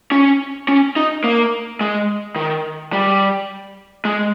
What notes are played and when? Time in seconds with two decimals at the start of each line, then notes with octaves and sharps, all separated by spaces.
0.12 C#4
0.68 C#4
0.96 D#4
1.24 A#3
1.81 G#3
2.36 D#3
2.93 G3
4.05 G#3